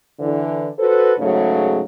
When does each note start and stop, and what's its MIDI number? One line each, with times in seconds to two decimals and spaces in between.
0.20 0.68 50
0.20 0.68 52
0.78 1.13 66
0.78 1.13 69
0.78 1.13 71
0.78 1.13 72
1.18 1.81 44
1.18 1.81 49
1.18 1.81 54
1.18 1.81 57